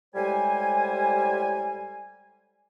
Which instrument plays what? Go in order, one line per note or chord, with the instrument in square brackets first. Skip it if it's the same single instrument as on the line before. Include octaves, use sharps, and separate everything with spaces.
[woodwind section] A2 G3 G#3 C5 G#5